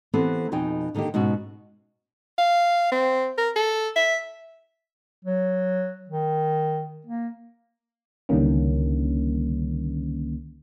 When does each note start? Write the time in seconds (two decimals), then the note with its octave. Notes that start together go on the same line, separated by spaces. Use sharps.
0.13 E3 B3 C4 G4 A4
0.52 F2 B2 D#4 G5 G#5
0.95 D3 D#3 A#3 D#4 G4
1.14 G#2 B2 C#4 F#4
2.38 F5
2.92 C4
3.38 A#4
3.56 A4
3.96 E5
5.25 F#3
6.09 D#3
7.06 A#3
8.29 C#2 D3 D#3 G3 A#3 C#4